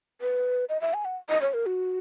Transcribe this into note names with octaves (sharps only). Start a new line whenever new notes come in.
B4
D#5
E5
G#5
F#5
D#5
C#5
A#4
F#4